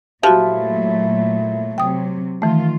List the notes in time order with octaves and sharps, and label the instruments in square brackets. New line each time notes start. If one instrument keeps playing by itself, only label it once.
[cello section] A#2 F#3 A3 [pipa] F3 [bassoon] E4 [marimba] F#4 G4
[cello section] C3 F#3 [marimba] G5 D#6
[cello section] D#3 F4 [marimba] E3 A3